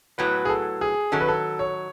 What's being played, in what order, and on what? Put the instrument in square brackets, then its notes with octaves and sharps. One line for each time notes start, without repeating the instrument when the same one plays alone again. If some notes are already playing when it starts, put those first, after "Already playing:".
[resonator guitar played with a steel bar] A2 F#3 B3 [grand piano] B4
[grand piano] G#4
A4
G#4
[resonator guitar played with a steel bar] D#3 F#3 C#4 [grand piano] A4
[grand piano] B4
A4
C#5